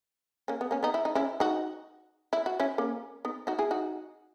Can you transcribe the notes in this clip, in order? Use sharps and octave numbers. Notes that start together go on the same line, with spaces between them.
A#3 C#4
B3
A#3 C#4
B3 D#4
E4
D#4
C#4 E4
D#4 F#4
E4
F#4
C#4 E4
A#3 C#4
B3 D#4
D#4 F#4
E4 G#4
D#4 F#4